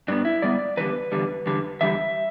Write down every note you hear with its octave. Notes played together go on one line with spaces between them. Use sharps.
G2 G3 B3 D4
E4
G2 G3 B3 D5
E2 D3 G3 B4
E2 D3 G3
E2 D3 G3
E2 D3 G3 E5